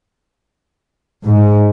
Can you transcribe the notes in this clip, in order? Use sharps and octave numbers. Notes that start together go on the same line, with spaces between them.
G#2